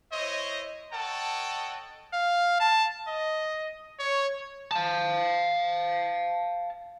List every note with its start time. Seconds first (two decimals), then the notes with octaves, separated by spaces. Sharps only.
0.12 E4 C5 C#5 D#5
0.93 A4 C#5 D#5 F#5 G5 A5
2.13 F5
2.60 A5
3.08 D#5
3.99 C#5
4.71 F5 A5